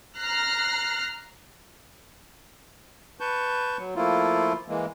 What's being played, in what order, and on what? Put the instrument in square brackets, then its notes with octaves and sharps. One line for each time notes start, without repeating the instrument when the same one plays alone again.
[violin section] A#5 F6 F#6 A#6 C7
[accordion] B4 A5 C#6 G6
F#3
F3 A3 A#3 E4 F4
E3 G#3 A#3